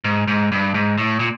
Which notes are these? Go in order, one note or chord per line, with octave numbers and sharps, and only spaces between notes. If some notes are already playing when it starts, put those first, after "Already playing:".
G#2
G#2
G2
G#2
A2
A#2